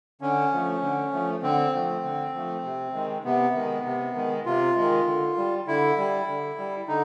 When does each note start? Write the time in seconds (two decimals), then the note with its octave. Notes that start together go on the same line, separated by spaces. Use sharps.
0.21 D3 C#4
0.52 F3 A3
0.82 D3
1.12 F3 A3
1.42 D3 C4
1.73 F3 A3
2.03 D3
2.34 F3 A3
2.64 C3
2.94 D#3 G#3
3.24 C3 B3
3.55 D#3 G#3
3.85 C3
4.15 D#3 G#3
4.46 C3 F4
4.76 D#3 G#3
5.06 D3
5.37 G3
5.67 D3 E4
5.97 G3
6.27 D3
6.58 G3
6.88 D3 D#4